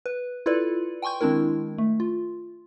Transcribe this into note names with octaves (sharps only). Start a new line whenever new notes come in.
B4
E4 F4 A4 B4 D5
G5 G#5 C6 C#6 G6
D#3 G#3 C4 D4 E4 A#4
A3
F4